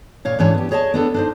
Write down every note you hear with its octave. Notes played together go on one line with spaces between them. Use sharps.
A#2 C#5 F5
G#2 E3 C#4 D4 C#5
B3 G4
G#4 C#5 D#5 F#5 A5
B3 D4 A4
D4 D#4 C5